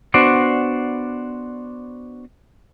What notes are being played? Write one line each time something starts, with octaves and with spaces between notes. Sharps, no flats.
B3 D4 F#4 C5 D5